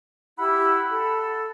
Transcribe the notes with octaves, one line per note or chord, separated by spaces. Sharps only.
E4 G4 F#5 B5 E6
A4